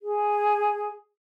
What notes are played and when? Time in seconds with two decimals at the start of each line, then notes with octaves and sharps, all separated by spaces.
0.01 G#4